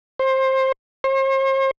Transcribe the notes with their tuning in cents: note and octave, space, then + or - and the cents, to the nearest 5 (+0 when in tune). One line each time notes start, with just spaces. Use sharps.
C5 +20
C5 +45